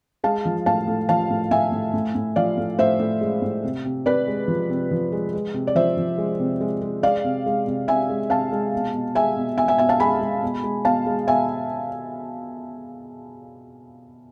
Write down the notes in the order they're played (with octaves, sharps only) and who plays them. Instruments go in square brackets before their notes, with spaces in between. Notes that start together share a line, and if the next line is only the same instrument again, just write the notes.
[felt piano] G#3 F5 A5
F3
A2 F5 A5
A2
F3 F5 A5
A2
A2 E5 G#5
A2
A2
A2
F3 D5 F5
A2
A2 C5 E5
A2
G#3
A2
C3
C3
C3 B4 D5
G#3
F3
C3
F3
G#3
G#3
C3
D5
F3 C5 E5
F3
G#3
C3
G#3
G#3
G#3 D5 F5
C3
G#3
C3
C3 E5 G#5
G#3
C3 F5 A5
G#3
B2
B2
G#3 E5 G#5
B2
B2 E5 G#5
E5 G#5
B2 E5 G#5
F5 A5
G#3 G#5 B5
G#3
B2
G#3
B2 F5 A5
G#3
B2 E5 G#5